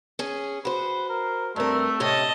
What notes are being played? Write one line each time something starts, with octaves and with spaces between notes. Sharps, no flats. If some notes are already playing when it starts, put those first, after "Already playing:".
C#4 G#4
F#4 B4 C5
A#4
G2 A3 C4 A#4
A2 C3 C#4 D#5 A5